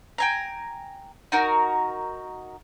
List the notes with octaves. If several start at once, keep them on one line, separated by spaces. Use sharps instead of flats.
G5 G#5 A#5
D#4 F#4 A#4